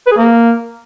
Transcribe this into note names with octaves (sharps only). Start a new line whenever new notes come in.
B4
G#4
A#3